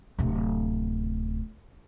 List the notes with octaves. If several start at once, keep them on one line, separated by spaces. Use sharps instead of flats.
D1 C3